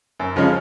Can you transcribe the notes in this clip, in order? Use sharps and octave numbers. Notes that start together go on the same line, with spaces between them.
F#2
C#3 F3 G#3 C#4